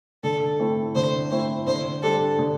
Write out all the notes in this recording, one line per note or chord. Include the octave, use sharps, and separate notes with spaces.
D3 A4
A3 C4 E4
D3 C5
A3 C4 E4 C5
D3 C5
G3 D4 A4
D3